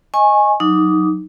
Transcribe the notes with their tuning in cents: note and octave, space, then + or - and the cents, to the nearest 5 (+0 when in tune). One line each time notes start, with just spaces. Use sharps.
D#5 +0 G#5 +0 C#6 -25
F#3 -15 D#4 +0 D6 -15